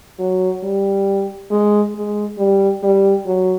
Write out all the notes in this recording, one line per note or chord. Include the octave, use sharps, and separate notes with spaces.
F#3
G3
G#3
G#3
G3
G3
F#3